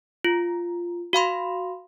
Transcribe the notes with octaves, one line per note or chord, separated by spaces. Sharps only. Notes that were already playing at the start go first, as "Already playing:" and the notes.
F4
F#4 F5 B5 C6